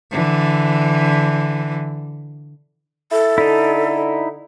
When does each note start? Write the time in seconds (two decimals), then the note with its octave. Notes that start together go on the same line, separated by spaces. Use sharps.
0.11 D3 E3
3.12 E4 A4
3.38 D3 D#4 E4